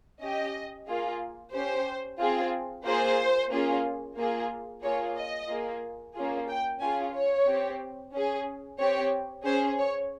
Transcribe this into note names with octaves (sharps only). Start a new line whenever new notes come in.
C#4 G4 D#5
A#3 F4 G#4
C#4 G4 C5
C4 F4 G#4
A#3 F4 G#4 C5
A#3 C#4 F4 G#4
A#3 F4 G#4
A#3 F4 G#4 C#5
D#5
A#3 F4 G#4
A#3 C#4 F4 G#4
G5
C#4 F4 G#4 G#5
C#5
C4 G4
C#4 G#4
C4 G4 C#5
C#4 G#4 C5
C#5